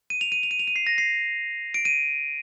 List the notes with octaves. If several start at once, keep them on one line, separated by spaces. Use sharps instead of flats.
D#7
F7
D#7
F7
D#7
F7
D#7
C7
A#6
C7
D7
D#7